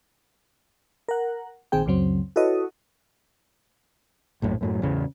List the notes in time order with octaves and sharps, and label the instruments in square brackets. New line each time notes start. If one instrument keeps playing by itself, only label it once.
[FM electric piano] A#4 F#5
A#1 D#3 C4 G#4 G5
C#2 F#2 C#3 F#3 C4
E4 F#4 A4 B4 C#5 D#5
[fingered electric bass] A#1 F#2 A2
F#2 A2 F#3
A1 E2 C#3